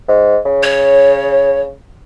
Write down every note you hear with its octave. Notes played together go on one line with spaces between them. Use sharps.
G#2
C#3
C#5